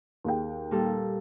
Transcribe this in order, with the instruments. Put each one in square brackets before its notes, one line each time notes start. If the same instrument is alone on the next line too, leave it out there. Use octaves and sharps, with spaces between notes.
[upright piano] D#2 G#4 G5
[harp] A#2 G3 A4